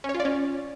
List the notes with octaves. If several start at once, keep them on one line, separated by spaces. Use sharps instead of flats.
C#4
C#5
F4
D5
C#4